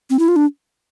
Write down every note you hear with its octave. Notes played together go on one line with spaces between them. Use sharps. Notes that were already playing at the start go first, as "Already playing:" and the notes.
C4
E4
F4
D4